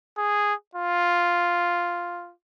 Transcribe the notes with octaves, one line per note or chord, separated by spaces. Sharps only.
G#4
F4